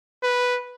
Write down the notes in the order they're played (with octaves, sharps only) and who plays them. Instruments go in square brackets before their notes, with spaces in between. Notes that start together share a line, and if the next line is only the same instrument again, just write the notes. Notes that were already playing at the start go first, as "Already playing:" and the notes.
[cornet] B4